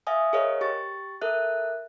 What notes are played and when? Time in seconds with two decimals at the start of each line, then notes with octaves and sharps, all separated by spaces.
0.07 E5 F5 G#5 D#6
0.33 G#4 A#4 C5 C#5 D#5 F5
0.61 G4 C#6 A6
1.21 A4 A#4 E5 F#6